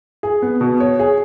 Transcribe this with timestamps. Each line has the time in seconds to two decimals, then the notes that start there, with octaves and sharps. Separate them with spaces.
0.23 G#4
0.42 B3
0.61 B2
0.80 C#5
0.99 G#4